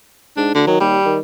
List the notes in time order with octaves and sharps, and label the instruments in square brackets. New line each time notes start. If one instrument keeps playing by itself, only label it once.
[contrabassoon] G#2 [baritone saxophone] D4
[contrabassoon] D2 [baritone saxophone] D3
[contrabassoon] D#3 [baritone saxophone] F#3
[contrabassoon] D#2 [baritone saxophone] G3
[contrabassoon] D#3